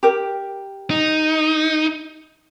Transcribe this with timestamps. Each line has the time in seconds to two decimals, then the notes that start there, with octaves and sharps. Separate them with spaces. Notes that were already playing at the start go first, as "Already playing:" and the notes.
0.03 G4 A#4
0.90 D#4